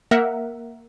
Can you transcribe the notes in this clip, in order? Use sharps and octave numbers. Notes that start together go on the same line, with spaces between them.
A#3 A#4 E5 F#5